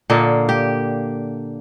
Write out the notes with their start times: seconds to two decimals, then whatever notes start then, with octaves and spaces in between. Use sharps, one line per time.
0.10 A#2 D3 A#3 D#5
0.49 G4